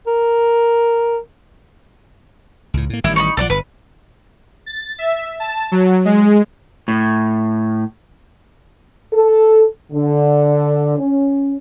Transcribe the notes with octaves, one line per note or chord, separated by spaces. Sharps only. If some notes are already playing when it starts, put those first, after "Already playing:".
A#4
C#2 A2
A2 A#3
A1 D#3 G3 E4
D#4 B5 C#6
B1 F3 A4 D5 F#5
G1 B4
A6
E5
A5
F#3
G#3
A2
A4
D3
C#4